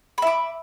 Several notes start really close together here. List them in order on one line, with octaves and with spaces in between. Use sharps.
B5 E5 D6